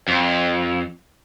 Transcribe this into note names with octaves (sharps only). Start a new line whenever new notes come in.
F2